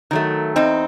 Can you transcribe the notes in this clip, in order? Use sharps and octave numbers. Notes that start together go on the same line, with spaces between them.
D#3 F#3 A3
E2 C4 D#4